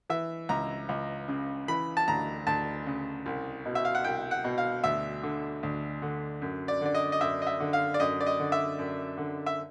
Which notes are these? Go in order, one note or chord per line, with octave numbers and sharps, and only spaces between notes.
E3 E5
C#2 A#5
C#2
C#3
E3 B5
A5
D2 A#5
D2 A5
C#3
C2
B2
E5
F5
F#5
C2 G5
F#5
B2
F5
D2 E5
D3
D2
D3
F#2
D5
D3 D5
D#5
D#5
F#2 E5
D#5
E5
D3
F5
D5
F#2 D#5
D5
D#5
D3
E5
F#2
D3
E5